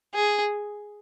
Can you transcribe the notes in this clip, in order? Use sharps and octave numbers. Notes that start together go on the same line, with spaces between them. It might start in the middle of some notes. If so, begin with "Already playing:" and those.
G#4